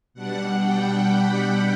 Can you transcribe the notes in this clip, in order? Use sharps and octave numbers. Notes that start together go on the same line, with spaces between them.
B2 G3 D4 F#5
G5
B5